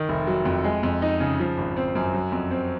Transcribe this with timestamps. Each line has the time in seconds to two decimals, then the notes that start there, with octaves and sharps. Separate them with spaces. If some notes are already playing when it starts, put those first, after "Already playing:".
Already playing: D#3
0.09 F1
0.27 F#3
0.45 F2
0.64 G#3
0.83 F2
1.02 D#4
1.20 C#3
1.40 F3
1.57 G#1
1.77 C4
1.95 F#2
2.14 F#3
2.32 F2
2.51 C4